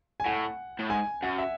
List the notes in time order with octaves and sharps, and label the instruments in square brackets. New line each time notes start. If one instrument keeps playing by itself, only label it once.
[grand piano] G#5
[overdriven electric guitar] A2 [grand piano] F#5
[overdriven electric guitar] A2
[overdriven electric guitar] G#2 [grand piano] G#5
[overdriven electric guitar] F#2 [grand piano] F#5
[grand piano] E5